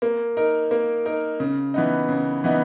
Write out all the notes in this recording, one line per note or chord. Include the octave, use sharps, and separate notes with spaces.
A#3
D#4 A#4
A#3
D#4 A#4
C#3
E3 B3 D#4
C#3
E3 B3 D#4